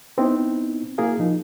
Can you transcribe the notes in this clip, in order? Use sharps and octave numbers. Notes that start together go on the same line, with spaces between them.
B3 C4 D#4 E4
A#3 E4 F#4 G#4 A#4 F5
F3 D#4